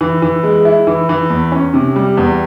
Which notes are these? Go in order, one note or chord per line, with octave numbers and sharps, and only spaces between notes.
E3
E3
G#3
E4
E3
E3
E2
C#4
C3
G3
E2